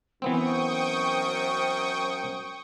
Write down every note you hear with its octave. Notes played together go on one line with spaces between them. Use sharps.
F#2 E3 B3 C4 C5 G5 C#6 D#6